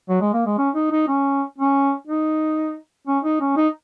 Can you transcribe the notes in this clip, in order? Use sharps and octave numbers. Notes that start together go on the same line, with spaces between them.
F#3
G#3
A#3
G#3
C#4
D#4
D#4
C#4
C#4
D#4
C#4
D#4
C#4
D#4